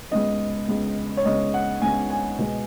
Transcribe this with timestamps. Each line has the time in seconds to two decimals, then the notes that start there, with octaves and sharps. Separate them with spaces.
0.11 C#2 C#3 B3 D#5
0.68 C#2 C#3 B3
1.17 C#5
1.25 C#2 C#3 B3 D#5
1.54 F#5
1.82 C#2 C#3 B3 G#5
2.10 G#5
2.39 B2 G#3 B3